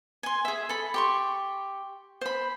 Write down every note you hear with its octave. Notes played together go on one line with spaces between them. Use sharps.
G#5 C6
G#4 E5
A4 B5
G4 C6 C#6
C5 B5